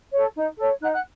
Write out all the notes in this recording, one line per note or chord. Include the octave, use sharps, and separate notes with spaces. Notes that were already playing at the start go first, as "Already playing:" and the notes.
A4 C#5
D#4
A4 C#5
D#4 F#5 F#6
F#5 F#6